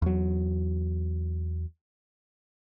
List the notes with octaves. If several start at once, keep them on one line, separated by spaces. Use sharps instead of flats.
E2 F#3